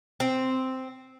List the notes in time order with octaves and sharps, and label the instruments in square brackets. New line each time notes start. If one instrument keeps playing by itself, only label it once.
[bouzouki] C4